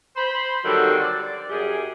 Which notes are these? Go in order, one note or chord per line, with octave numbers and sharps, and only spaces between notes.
C5 B5
D3 D#3 F#3 G3 C4
D5
F#2 G3 G4 G#4